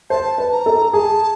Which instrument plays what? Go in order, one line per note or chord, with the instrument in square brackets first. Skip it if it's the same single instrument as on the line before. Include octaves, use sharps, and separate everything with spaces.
[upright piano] C5 [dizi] A5
[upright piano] B4
[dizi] A#5
[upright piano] A4
[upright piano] G#4 [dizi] A5